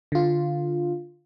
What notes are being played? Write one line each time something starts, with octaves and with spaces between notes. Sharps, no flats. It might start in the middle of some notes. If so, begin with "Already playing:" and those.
D3 F4